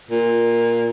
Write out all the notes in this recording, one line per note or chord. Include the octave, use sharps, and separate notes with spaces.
A#2